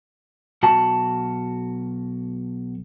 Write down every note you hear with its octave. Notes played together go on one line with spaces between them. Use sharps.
B1 F#4 A5